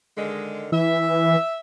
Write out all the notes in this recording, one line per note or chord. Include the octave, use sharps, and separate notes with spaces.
D3 D#3 G#3
E3 E5